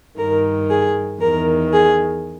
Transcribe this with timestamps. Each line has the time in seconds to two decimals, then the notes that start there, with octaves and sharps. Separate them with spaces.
0.18 G2 D#3 A#4
0.70 G#4
1.22 E2 D#3 A#4
1.73 G#4